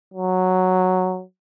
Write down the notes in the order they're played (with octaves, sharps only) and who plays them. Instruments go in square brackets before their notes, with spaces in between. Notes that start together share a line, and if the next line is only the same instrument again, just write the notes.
[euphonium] F#3